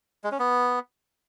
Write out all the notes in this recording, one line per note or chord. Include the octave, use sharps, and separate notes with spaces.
G#3
C#4
B3